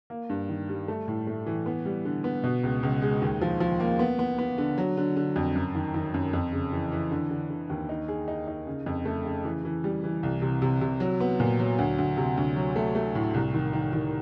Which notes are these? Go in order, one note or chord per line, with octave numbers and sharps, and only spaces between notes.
A#3
G2
D#3
G3
A3
A2
A3
E3
B3
G3
D3
B3
B2
C#2
C#2
G#3
D#2
F3
F3
A#3
B3
B3
B3
D3
F#3
D3
D3
F2
F#2
D#3
D#3
F#2
F2
C#3
E3
E3
D3
D3
D3
D#2
D#4
G#4
D#4
D#4
C#3
F2
A3
C#3
E3
E3
G3
E3
C2
C3
C3
C3
F#3
B3
A#2
F#3
D2
D2
C3
D2
F#3
A3
A3
A2
C2
D#3
D#3
D#3